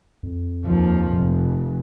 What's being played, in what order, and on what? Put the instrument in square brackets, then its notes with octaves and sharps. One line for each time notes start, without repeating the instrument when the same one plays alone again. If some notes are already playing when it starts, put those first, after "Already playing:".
[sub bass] F2
[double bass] D#2 F3
F1